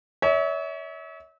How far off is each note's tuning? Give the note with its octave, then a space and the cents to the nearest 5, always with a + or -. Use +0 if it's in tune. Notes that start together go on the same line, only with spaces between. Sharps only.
C#5 +30 E5 -35